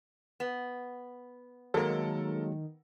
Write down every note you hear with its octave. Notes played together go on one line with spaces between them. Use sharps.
B3
D#3 F#3 G#3 A#3 A4 A#4